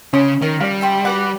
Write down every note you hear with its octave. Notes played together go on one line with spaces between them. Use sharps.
C#3 C#4 C6 D#6
D#3 A#4
G3 D5 F5
E5 G5 C6
F#4 B4 F#5 D6